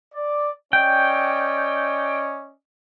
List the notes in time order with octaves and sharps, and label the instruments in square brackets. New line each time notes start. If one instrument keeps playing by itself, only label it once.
[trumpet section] D5
[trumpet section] C#4 D5 D#5 [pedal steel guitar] G5